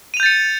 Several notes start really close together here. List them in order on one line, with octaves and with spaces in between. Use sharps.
D#7 F7 G6 A6 C#7